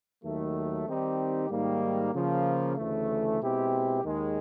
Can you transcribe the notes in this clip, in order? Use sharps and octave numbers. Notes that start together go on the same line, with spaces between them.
D#2 D#3 F#3 A3
D#3 G3 C4 D#4 G4
G#2 D#3 G3 A#3
C#3 F3 A#3
D2 C#3 E3 A3
B2 G#3 C4 E4 G4
D#2 D#3 G#3